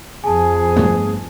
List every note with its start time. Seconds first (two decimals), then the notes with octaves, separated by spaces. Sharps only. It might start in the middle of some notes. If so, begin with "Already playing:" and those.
0.24 F2 G#4 G#5 A5
0.76 G2 A3 B3